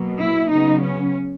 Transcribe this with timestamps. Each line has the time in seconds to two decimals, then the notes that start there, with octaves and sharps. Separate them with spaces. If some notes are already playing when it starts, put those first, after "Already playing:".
Already playing: B2 F#3 A#3
0.19 E4
0.51 C#3 F#3 B3 D#4
0.82 C#4